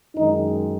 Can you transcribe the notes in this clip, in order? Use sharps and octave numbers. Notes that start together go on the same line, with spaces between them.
F#2 D#3 G#3 D#4